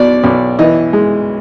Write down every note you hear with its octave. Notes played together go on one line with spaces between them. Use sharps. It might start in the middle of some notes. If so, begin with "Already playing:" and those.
Already playing: B1 B2 D5
B1
E3 D#5
G#3